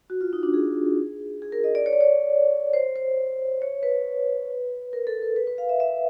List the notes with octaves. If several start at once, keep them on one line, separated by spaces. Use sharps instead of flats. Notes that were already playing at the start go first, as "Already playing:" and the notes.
F#4
F4
D#4
D4
G#4
G#4
A#4
D#5
D5
C#5
D5
C#5
C5
C5
C#5
B4
A#4
A4
A#4
B4
B4
F5
E5
E5